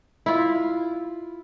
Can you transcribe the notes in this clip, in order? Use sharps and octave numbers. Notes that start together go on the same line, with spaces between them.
E4 F4